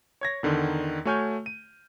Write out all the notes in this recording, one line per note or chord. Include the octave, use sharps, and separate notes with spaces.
C#5 G#6 A#6
E2 D3 D#3
A3 F#4 C#5 G#5 F6 G6
D#7